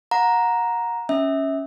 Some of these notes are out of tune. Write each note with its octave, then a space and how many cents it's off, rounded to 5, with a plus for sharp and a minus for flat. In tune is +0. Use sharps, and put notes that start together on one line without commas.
F#5 -30 A#5 +5
C#4 +0 E5 -25